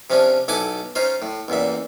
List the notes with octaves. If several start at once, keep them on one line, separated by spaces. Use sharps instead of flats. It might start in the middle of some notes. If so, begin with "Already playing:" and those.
C3 F3 C#4 D4
B1 E4 A4 F#5 G#5 D6
C#4 D#4 F4 C5
A2
A1 E2 A#2 E5